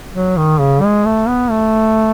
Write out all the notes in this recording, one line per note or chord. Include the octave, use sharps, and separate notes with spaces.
F#3
D#3
C#3
G#3
A3
B3
A3